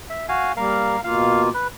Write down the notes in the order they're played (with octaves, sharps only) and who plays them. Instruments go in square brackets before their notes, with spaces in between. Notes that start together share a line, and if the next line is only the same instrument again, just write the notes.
[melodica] E5
F#4 F5 G#5
[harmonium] G3 A#3 [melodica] A#4 F5
[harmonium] B2 A#3 F4 [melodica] F5
[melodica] B4